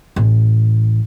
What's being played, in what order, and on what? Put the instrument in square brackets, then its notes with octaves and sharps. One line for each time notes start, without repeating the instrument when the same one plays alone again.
[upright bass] A1